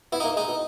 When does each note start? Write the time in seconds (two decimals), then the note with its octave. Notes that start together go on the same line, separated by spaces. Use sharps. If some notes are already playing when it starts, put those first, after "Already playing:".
0.12 B3 E4
0.20 D#4
0.24 A#3
0.36 G#3 D#4
0.48 B2